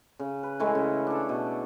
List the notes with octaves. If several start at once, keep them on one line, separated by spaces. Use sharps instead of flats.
C#3
B4
E3 G#3 A3 E4
C#3
D4 A4
B2